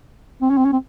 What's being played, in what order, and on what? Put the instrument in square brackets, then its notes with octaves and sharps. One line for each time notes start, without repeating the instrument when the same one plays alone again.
[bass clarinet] C4
C#4
C4
C#4
C4